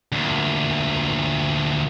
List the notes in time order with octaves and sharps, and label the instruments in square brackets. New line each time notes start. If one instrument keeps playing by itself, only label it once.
[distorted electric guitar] D2 A#2